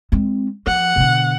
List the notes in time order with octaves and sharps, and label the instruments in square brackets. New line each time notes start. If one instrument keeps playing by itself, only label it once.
[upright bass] G#3 C4
[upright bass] F3 [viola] F#5
[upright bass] B2 D3